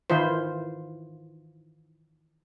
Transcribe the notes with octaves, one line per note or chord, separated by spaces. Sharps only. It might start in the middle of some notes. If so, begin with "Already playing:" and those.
D#3 E3 E4 F4 C5